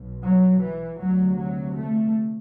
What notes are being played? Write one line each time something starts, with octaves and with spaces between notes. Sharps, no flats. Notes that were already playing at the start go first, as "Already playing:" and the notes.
Already playing: B1 B2
F#3
E3
D2 C3 F#3
F#3
A3